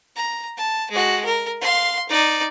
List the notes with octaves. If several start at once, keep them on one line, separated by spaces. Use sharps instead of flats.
A#5
A5
G#3 F#4
A#4
F5 C6
D#4 D5